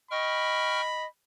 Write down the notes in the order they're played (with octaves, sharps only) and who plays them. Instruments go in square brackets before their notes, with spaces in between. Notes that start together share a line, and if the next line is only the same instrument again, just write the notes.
[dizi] D#5 [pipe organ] G5 C#6 F6 [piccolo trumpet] B5